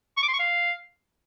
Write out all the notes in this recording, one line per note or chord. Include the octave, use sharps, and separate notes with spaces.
C#6
D6
C6
C#6
F5